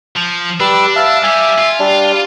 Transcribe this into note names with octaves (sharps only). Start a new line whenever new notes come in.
F3
G3 D4 B4 E6
E5 F5 A5
G3 G4 E5 G#5
F4
G3 D4